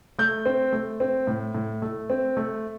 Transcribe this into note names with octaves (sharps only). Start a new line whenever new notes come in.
A3 G6
C4
A3
C4
A2
A2
A3
C4
A3